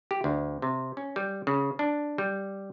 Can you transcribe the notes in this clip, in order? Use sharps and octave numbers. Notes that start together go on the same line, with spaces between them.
G4
D2
C3
C#4
G3
C#3
D4
G3